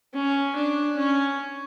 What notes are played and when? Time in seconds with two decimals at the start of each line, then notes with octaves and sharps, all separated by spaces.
0.14 C#4
0.55 D4
0.97 C#4